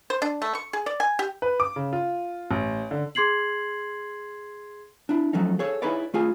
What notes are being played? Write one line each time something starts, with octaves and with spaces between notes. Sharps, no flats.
C5
D4
A3
C#6
G#4
D5
G#5
G4
B4
D6
C#3
F4
A1
D3
G#4 C6 G#6 C7 F#7
D4 E4
F3 F#3 A3 C#4 D#4
G#4 A4 C#5
D#4 E4 G#4 B4 C#5 D5
A3 F4 G#4 G#5